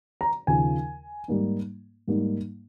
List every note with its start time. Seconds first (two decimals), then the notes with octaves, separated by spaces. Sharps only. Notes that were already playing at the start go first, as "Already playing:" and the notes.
0.21 A#5
0.47 D#2 C#3 F3 G#5
1.28 G#2 G3 A#3 D#4
2.07 G#2 G3 A#3 D#4